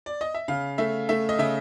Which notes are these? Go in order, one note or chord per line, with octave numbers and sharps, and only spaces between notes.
D5
D#5
E5
C#3 F5
A3 E5
A3 E5
D#5
C#3 E5